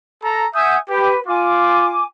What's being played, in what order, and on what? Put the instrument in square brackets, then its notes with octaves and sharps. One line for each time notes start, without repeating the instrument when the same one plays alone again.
[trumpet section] A4 A#5
[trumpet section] E5 G#5 D#6 [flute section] F#5 G6
[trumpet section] G4 [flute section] B4
[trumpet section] F4 [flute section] G#5 D6